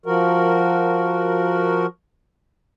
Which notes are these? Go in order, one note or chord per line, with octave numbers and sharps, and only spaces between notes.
F3 F#4 A#4